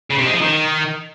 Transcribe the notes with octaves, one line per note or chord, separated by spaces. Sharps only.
C#3
C3
G#3
F3
D#3